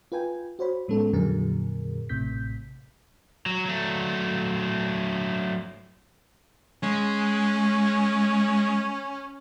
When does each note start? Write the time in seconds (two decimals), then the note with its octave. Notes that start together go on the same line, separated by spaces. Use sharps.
0.12 F4 B4 G5 G#5
0.59 F#4 C5 C#5 B5
0.88 A2 G#3 B3 C#4 A4
1.13 F2 A#2 D3 F#3 G#4 A#4
2.09 A1 A2 C3 G6 B6
3.46 F#3
3.66 F#3 A3
6.83 G#3 C#4